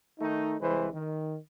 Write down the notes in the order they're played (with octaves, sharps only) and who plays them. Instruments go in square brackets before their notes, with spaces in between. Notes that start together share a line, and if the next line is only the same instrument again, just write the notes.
[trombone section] D#3 A3 D#4
C2 E3 G#3 B4 C5
D#3